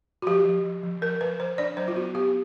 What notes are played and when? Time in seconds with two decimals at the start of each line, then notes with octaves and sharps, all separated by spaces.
0.22 F#4
0.27 F3 G4
0.45 F3
0.64 F3
0.83 F3
1.02 F3 A#4
1.21 F3 B4
1.40 F3 C5
1.58 D4 D5
1.77 F#3 C5
1.88 F4
1.96 B3 F#4
2.15 B3 G4